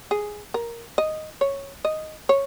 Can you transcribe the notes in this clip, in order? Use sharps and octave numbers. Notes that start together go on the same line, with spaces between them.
G#4
A#4
D#5
C#5
D#5
C#5